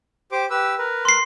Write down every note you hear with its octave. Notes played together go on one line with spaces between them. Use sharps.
G4 C5 D6
G4 B4 E6
A#4 B4
C6 C7